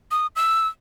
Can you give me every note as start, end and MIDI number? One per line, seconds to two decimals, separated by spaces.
0.11 0.27 87
0.36 0.68 88